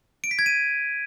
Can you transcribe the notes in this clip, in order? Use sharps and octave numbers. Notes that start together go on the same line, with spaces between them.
D7
B6
G#6
D#7